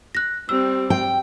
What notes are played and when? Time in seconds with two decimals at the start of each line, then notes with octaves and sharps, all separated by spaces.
0.15 F#6 A#6
0.49 G3 C4 E6
0.90 G5